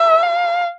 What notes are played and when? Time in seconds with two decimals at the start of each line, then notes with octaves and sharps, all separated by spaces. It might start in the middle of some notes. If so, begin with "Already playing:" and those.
Already playing: E5
0.23 F5